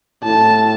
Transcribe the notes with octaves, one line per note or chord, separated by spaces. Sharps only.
A2 A5